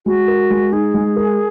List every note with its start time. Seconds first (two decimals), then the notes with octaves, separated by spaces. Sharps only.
0.06 G#3 F#4
0.28 A#4
0.50 G#3
0.72 D#4 G#4
0.94 G#3
1.16 A#4